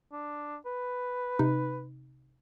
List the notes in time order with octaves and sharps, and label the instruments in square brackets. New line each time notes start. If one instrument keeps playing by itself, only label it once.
[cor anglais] D4
B4
[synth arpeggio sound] C3 D#4